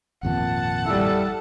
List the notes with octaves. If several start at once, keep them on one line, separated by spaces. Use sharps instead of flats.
G#1 F2 A#2 F#5 A5
G3 E4 A4